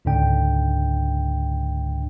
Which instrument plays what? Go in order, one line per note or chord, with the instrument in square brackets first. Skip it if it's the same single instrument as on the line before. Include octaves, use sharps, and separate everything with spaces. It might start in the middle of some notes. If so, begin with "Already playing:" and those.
[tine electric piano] C#2 G#2 D3 D4 G5